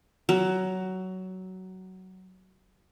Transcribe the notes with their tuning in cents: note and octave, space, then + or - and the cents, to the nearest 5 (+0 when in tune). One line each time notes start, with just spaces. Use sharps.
F#3 +15